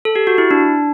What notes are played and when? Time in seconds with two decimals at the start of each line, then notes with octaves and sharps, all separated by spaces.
0.05 A4
0.16 G4
0.27 F#4
0.38 E4
0.51 D4